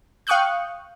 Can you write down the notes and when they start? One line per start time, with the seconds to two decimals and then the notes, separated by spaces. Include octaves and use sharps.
0.27 F5 G5 C#6 D#6 F#6 G6